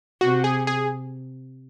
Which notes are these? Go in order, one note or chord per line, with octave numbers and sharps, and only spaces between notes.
C3 F#4
G#4
G#4